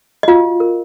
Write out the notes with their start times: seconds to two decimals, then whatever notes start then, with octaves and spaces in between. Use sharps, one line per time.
0.23 D#5
0.28 F4 F#4 F5
0.60 A#4